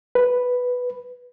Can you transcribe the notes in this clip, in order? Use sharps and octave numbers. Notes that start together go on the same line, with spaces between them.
B4